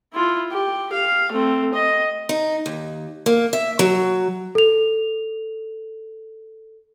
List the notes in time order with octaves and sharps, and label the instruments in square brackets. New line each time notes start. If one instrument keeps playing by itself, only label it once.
[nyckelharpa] E4 F4
G4
F5
A3 C4
D#5
[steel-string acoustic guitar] D#4
D#2
A#3
E5
F#3
[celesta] A4 F7